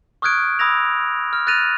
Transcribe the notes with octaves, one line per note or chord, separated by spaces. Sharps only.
C#6 D#6 F6 F#6 G#6 D7
B5 D#6 E6 G#6 A#6 F7
F6
F#6 A6 A#6 D#7 F7